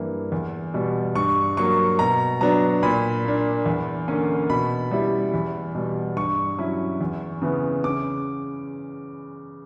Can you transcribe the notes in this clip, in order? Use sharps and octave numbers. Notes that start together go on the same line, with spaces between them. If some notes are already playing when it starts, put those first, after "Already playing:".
Already playing: G2 E3 A#3
E2
B2 G3
G2 C#6
F#3 A#3 C#6
B2 A#5
F#3 B3 D4 A#5
A#2 B5
A#3 D4
E2
D3 A#3 C#4
B2 B5
G3 C#4 E4
E2
B2 G3
G2 C#6
F#3 C#4 E4
E2
C#3 E3 B3
C#3 D6